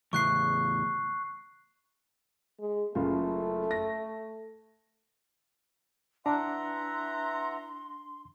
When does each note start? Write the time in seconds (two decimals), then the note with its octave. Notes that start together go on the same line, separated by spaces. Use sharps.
0.13 E2 A2 C#3 C#6 F#6 C7
2.59 G#3
2.95 F#1 C#3 A3 F4
3.71 A#6
6.26 E3 D4 E5 F#5 A#5 C6